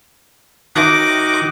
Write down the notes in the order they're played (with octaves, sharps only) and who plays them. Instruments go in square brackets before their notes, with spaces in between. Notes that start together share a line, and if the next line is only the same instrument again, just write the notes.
[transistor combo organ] D#3 D#4 F#4 [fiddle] D6